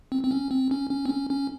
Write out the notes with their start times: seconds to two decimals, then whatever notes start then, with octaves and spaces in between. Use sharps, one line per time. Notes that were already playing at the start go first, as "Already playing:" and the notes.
0.12 C4
0.23 C4
0.31 C#4
0.51 C4
0.71 C#4
0.91 C#4
1.06 C4
1.10 C#4
1.30 C#4